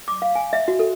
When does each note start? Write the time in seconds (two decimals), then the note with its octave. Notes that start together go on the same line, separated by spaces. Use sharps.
0.08 D6
0.22 F5
0.36 G#5
0.53 E5
0.68 F#4
0.79 A4